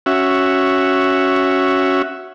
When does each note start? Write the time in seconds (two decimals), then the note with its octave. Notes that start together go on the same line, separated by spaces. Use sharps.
0.06 C#4 F#4 E5